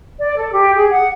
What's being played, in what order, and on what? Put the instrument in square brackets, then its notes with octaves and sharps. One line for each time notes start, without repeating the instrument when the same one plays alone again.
[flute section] D5
A4
G4
G#4
F#5